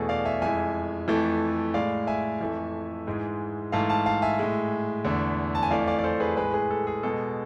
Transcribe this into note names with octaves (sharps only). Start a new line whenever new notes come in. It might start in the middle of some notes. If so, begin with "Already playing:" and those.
Already playing: E2 B2 A3 G#4 A4
D5 F5
E5 G#5
F2 E3 G#3 E5 G#5
F2 E3 A3
A2 G#3 D5 F5
E5 G#5
F2 E3 A3
G#2 E3 G#3
G#2 E3 A3 F5 A5
F5 A5
F5 A5
E5 G#5
A2 G#3
E2 D3 A3
A5
G#5
F2 E3 A3 D5 F5
G#5
D5 F5
D5
A4 C5
G#4 B4
G#3 G#4 B4
A2
G#4 B4
A4
G#4
B2 G#3 A4